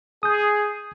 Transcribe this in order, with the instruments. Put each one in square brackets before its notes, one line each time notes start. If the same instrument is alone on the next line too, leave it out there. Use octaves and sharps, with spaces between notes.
[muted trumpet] G#4 [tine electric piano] D#6 G6